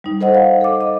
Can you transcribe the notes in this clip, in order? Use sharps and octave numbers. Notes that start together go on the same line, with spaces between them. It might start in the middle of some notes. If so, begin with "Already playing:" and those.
G3 D#4
A4 C5 D#5 F#5
F5
A4 D6
D#5